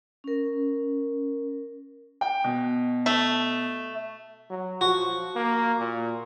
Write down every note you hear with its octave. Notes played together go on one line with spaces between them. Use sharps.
C#4 A#4
G5
B2
A3
F#3
F3 F#4
A#3
A#2